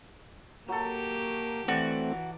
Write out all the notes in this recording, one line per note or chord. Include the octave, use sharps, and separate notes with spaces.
F#3 A#3 G4 A4
E3 A3 C4 F#4 D5